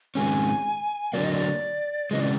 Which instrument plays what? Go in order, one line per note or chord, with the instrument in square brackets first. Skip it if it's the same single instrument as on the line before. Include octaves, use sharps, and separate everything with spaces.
[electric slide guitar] G#2 D#3 G#3 C#4 [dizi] G#5
[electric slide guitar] D3 F#3 A#3 [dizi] D5
[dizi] D#5
D5
[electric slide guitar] C#3 E3 G#3 [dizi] D#5
[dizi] D5